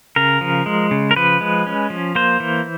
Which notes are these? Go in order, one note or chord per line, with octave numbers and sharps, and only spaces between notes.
C#3 A#4
F3
G#3
C#3
A#4
F3 B4
G#3
C#4
F3
A#3 C5
E3